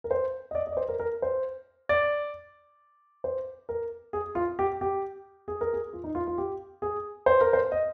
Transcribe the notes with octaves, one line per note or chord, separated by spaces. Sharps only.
A#4
C5
D#5
D5
D#5
D5
C5
A#4
A#4
C5
D5
C5
A#4
G#4
F4
G4
G4
G#4
A#4
G#4
F4
D#4
F4
F4
G4
G#4
C5
A#4
C5
D#5